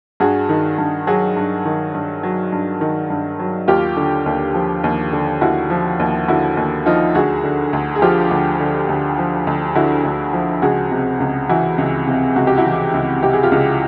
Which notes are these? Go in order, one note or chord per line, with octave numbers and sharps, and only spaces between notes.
G2 F#4 G#4
D#3
G2
F#3 F#4 G#4
G2
D#3
G2
F#3
G2
D#3
G2
F#3
D#2 F4 G4
D3
D#2
F3
D#2
D3
D#2 E4 F#4
F3
D#2
D3 E4 F#4
D#2
F3 D#4 F4
D2 F#4 G#4
D3
D2
G#4
F3 F4 G4
D2
D3
D2
F3
D2
D3 E4 F#4
D2
F3
C#2 F#4 G#4
C3
C#2
E3 E4 F#4
C#2
C3
C#2 F#4
G4
E4 F#4
E3
C#2
C3 G4
G#4
F4 G4
C#2